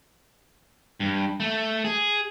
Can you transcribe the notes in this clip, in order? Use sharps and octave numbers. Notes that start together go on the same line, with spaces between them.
G2
A3
G#4